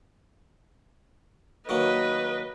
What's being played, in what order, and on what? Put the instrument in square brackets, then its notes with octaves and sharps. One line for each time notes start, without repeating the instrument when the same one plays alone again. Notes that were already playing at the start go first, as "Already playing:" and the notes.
[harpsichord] D#3 F#3 A#3 [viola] B4 D#5